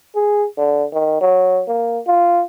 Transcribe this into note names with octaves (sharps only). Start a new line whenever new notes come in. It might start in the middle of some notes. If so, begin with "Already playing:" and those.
G#4
D3
D#3
F#3
A#3
F4